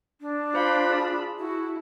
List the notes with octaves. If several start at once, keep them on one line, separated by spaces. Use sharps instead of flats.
D4
F4 C5 F5 B5
G#4 A5
E4 F#4